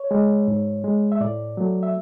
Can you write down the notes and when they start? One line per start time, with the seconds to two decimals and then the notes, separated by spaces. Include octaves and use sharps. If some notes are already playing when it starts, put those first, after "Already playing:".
Already playing: C#5
0.11 G#3
0.48 G#2
0.84 G#3
1.12 E5
1.21 A2 D5
1.57 F#3 A3
1.83 E5